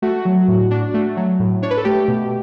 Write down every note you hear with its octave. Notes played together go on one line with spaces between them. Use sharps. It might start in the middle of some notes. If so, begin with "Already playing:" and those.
A3 F#4
F#3
A2
D4
A3
F#3
A2
D4 C#5
B4
A4
A3 G4
B2